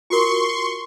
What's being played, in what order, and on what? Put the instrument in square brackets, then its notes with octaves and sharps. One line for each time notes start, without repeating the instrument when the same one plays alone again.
[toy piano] F4 F#4 A#4 [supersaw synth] C6 C#6